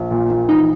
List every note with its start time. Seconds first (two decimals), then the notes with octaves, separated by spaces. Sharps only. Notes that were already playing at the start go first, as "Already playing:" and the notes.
Already playing: A#1
0.11 A#2
0.30 A#1
0.49 E3 D#4